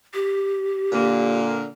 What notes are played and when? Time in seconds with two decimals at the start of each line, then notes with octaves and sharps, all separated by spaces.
0.14 G4
0.92 A#2 D3 A#3